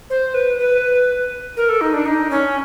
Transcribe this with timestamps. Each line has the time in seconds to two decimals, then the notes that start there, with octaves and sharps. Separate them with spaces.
0.10 C5
0.34 B4
0.59 B4
1.57 A#4
1.69 A4
1.81 D#4
1.94 D4
2.06 D#4
2.30 C#4